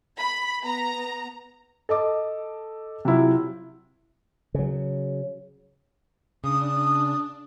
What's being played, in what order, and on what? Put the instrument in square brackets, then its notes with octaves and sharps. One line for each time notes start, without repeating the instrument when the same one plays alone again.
[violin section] B5
B3 A#5
[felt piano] A4 D#5 D6
C3 F#3 E4 F4
[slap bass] C#3 F#3
[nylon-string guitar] C#3 [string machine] D4 [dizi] D#6